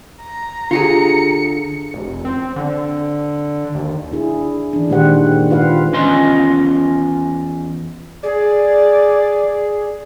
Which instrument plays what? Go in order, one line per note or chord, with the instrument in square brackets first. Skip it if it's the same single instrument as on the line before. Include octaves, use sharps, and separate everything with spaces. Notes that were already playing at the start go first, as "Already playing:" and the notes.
[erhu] A#5
[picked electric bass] D3 [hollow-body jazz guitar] F4 G4 G#4 [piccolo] C#7
[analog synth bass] F1
C4
D3
D#2
[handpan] D4 E4 G#4
E3 D4
A#2 D#3 G#3 G4 C5 F#5
F4 B4 F5 F#5
[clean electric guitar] E2 C#4 F4 D#5 C6
[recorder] G#4 [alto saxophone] D5